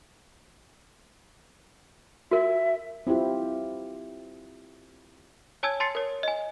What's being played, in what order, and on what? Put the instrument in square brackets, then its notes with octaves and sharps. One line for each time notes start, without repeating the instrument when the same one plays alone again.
[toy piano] F#4 A#4 [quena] E5
[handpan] C4 E4 F4 G4
[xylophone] C#5 G#5 A5 E6 G#6
A5 C6 A6 C7 C#7
A#4 C#5
D#5 G#5